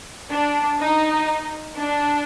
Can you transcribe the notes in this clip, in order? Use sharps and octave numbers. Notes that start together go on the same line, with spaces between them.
D4
D#4
D4